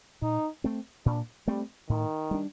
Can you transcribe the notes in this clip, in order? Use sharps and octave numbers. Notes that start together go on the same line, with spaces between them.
A#2 D#4
A3 C4
A#2 D4
G3 A3 C4
A2 D#3
G3 D4